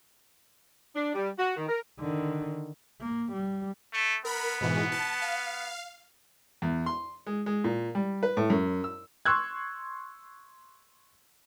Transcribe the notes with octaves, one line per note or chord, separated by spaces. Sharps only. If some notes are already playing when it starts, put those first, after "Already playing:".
D4
G3
F#4
D#3
A#4
D3 D#3
A#3
G3
A3
B3 A#4 B5
G#2 B2 E3
A5
F5
E2
C6
G#3
G#3
A#2
G3
B4
A2
F#2
E6
C6 C#6 E6 F#6 G#6